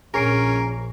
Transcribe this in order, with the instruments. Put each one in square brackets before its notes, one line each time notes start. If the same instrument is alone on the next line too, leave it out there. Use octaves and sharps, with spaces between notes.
[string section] A#1 [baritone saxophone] C#4 [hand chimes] G#4 C7 D7 [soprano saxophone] A#4